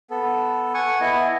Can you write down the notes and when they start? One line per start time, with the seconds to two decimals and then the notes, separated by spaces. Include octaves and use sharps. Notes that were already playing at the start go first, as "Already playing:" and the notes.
0.10 B3 A4
0.74 F#5 G#5 C#6
1.01 B3 E4 D#5 G#5